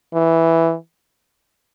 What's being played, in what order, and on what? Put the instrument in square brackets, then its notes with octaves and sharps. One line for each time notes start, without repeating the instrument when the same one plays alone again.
[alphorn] E3